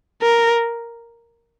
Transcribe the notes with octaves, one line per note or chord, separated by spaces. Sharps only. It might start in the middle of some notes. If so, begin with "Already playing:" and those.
A#4